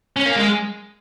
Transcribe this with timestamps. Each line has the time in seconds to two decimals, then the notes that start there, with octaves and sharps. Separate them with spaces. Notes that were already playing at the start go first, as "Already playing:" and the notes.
0.17 C#4
0.26 A#3
0.36 G#3